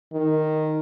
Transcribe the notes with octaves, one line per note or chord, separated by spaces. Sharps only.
D#3